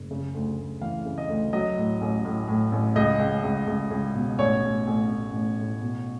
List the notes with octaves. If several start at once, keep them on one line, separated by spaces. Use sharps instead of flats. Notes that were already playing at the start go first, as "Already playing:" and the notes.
Already playing: F#1
C#3
D2
D2
E3 F5
C#3
D#5
D2
F#3 D#5
A2
A1
A2
A2
A1
C#2 D#5
C#2
C#2
C#2
C#2
B2
A1 C#5
A1
A1
A1
A1
A2
B2